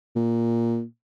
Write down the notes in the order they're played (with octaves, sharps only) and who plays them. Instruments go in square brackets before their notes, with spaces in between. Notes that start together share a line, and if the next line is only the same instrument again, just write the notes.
[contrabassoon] A#2